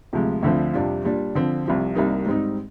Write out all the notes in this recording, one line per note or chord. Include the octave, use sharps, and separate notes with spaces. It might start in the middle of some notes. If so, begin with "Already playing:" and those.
D2 C3 F3 G#3
D2 D3 F3 C4
F2 C3 G3 D4 F4
A#2 G3 D4
D3 F3 C4
C2 C3 F3
C2 C3 G3 A#3 D#4
G#2 G3 C4 D#4